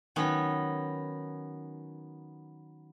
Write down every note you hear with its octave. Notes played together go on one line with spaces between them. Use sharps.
D#3 F#3 B3 C#4